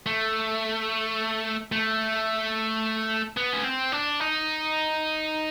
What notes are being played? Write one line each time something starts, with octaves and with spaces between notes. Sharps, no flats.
A3
A3
B3
C#4
C4
D4
D#4